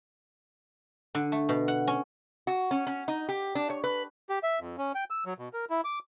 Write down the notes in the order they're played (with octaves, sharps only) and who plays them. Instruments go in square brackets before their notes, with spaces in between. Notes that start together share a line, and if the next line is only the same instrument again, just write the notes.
[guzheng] D3
A3
B2
F#5
C#4
[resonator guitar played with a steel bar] F#4
C#4
C#4
D#4
G4
D4
C#5
B4
[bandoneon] G4
E5
F2
C#4
G5
E6
F#3
B2
A#4
E4
D6